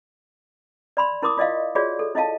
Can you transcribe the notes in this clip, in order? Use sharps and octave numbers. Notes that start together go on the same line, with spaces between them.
D5 B5 C6
E4 A#4 C6 D6 D#6
F4 D5 D#5 F5
F4 F#4 G#4 C#5 D5
A4
E4 D#5 F5 A5